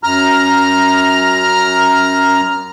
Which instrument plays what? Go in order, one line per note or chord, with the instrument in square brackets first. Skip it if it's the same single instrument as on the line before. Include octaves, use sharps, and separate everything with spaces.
[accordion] F#2 A#5 F6